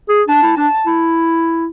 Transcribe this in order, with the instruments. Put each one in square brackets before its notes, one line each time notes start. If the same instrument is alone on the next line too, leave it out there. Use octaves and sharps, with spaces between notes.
[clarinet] G#4
[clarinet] D4 [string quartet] A5
[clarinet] E4
[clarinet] D4 [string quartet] A5
[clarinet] E4